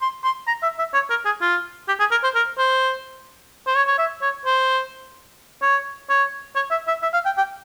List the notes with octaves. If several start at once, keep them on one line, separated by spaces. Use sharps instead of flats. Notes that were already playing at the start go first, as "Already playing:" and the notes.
C6
C6
A#5
E5
E5
C#5
A#4
G#4
F4
G4
G#4
A#4
C5
A#4
C5
C5
C#5
C#5
E5
C#5
C5
C#5
C#5
C#5
E5
E5
E5
F5
G5
G5